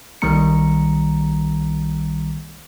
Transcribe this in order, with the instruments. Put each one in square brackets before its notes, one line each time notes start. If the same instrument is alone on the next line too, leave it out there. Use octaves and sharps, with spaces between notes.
[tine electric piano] B1 D#3 G3 A#3 A#5 C#7